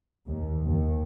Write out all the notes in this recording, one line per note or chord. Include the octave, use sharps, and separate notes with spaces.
D#2
D#2